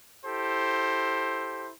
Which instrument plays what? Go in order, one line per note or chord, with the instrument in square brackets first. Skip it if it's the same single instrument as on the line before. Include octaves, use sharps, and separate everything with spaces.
[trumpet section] E4 G4 A4 C5